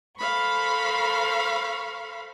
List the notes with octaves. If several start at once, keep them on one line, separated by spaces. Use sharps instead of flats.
A4 A#4 C5 F5 B5 C#6